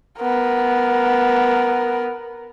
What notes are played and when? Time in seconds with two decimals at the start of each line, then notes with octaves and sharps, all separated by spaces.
0.20 B3 A#4